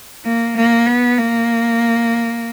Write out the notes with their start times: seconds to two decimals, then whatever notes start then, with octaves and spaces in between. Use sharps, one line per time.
0.25 A#3
0.56 A#3
0.87 B3
1.18 A#3